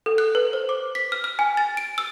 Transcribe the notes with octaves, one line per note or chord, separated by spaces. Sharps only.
A4
F#6
B4
C5
D6
B6
F6
F6
G#5
A6
D7
E6